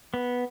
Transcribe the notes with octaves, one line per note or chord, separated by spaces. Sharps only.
B3